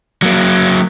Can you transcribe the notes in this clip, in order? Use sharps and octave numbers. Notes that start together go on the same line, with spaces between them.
F#3 A#3